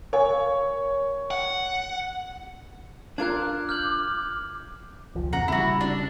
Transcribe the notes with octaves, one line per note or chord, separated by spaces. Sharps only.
A#4 C#5 F5 G#5
F#5
D4 F4 A#4 D6 F#6 G#6
F6 G6 F#7
F1 C#2 F3
E2 A#2 C#3 F#5 A#5
F1 C#3 G3 E4 F#4
D4